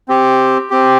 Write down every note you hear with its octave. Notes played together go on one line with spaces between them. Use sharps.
C4 G4
C4 G4